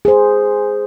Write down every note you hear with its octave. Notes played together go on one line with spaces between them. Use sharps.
G#4 C5